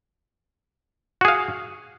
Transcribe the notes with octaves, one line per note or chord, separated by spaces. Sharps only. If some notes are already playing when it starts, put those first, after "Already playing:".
F#4 G#4 F5